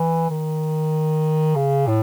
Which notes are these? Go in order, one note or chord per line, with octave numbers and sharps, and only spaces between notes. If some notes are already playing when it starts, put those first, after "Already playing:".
Already playing: E3
D#3
C#3
A2